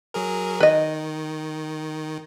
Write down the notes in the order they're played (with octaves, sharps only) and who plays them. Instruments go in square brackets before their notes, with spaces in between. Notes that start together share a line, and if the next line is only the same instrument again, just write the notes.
[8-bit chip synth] F#3 G#4 A#4
[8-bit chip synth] D#3 [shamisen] B4 D#5